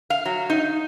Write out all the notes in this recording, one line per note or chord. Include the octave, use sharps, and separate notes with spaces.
F5
F#3
D#4